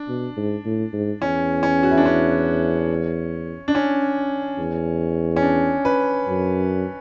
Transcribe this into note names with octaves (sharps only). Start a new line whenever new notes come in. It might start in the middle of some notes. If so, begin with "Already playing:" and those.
Already playing: D4
B2
G#2
A2
G#2
E2 C#4
C#4
F#4
E4
D4
C#4
D4
C#4
E2
C#4
D4
B4
F#2